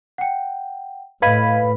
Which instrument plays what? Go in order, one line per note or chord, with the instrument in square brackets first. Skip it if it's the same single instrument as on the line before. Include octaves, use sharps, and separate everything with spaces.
[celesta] F#5 G5
[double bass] A2 [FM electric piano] B4 F5 B5 [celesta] D#5 G#6 D#7